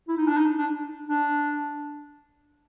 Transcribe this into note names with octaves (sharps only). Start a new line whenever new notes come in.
E4
D#4
D4
D#4
D4
D4